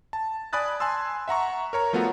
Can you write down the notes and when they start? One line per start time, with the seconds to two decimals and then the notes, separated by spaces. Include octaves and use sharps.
0.13 A5
0.53 D5 G#5 B5 D#6 F#6 A6
0.80 G#5 A5 C6 E6
1.28 E5 F#5 A#5 C#6
1.73 A#4 C#5 A#5
1.93 F3 A3 B3 F4 F#4